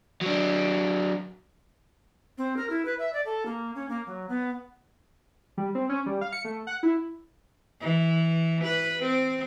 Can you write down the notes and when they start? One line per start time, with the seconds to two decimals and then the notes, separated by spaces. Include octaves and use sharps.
0.21 F#3 D4
2.37 C4
2.56 A#4
2.70 E4
2.85 B4
2.99 E5
3.13 D5
3.25 A4
3.45 A#3
3.75 C#4
3.89 A#3
4.06 F#3
4.29 B3
5.58 G3
5.75 C4
5.89 C#4
6.06 G3
6.21 F5
6.33 C#7
6.45 A3
6.67 F#5
6.83 E4
7.81 E3
8.64 B4
9.03 C4